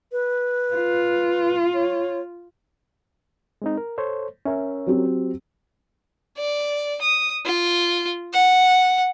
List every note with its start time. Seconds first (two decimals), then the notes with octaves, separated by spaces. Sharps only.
0.12 B4
0.74 F4
1.74 C#5
3.62 G#3 C4 D#4
3.77 A#4
3.98 A4 C5 C#5
4.45 C#4 A#4 C#5 E5
4.86 F#3 C4 G4
6.38 D5
7.01 D#6
7.46 F4
8.33 F#5